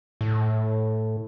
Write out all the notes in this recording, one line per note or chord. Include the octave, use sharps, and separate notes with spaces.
A2